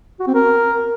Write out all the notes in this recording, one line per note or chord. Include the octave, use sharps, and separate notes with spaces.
F#4
C4
A#4